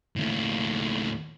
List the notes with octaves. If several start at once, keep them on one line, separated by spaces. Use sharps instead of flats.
D#2 A2